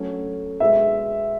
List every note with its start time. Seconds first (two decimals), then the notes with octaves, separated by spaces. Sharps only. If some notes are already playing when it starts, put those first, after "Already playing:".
Already playing: F#3 A3 C#4
0.60 B2 G#3 B3 E5